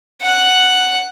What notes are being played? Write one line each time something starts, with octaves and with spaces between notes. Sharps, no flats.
F#5 F#6